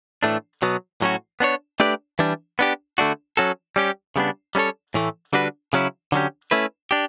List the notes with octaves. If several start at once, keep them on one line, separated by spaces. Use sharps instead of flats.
A2 E3 A3 D4
B2 F#3 B3
A2 F#3 C#4 F#4
B3 D4 F#4 C#5
A3 D4 G4 B4 D5
E3 G3 D4
B3 D4 G4
D3 A3 D4 F#4
F#3 C#4 F#4 A4
G3 C#4 G4
C#3 G3 B3 D4
G3 C#4 E4 A4 C#5
A2 E3 A3
D3 G3 D4 F#4 B4
C#3 F#3 C#4 E4
D3 F#3 C#4 G4
A3 C#4 E4 B4
D4 G4